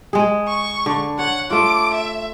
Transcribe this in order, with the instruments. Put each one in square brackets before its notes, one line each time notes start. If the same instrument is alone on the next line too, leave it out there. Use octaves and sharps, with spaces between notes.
[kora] G#3 G#4
[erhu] C#6
[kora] D3
[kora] C#5 [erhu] F#5
[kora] A3 F4 [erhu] D6
[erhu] E5